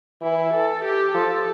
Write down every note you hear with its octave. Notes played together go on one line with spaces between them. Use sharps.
E3 E4
A4
G4
F3 A4